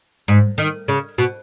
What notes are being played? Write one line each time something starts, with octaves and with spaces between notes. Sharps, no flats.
G#2
D#3
C#3
B2